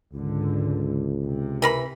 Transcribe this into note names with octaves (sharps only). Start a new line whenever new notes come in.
C#2 G#2 D3
C3
E3 A#4 B5